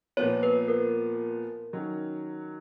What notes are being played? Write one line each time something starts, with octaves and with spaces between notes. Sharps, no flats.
A#2 F3 B3 C#5
B4
A#4
D#3 F#3 C#4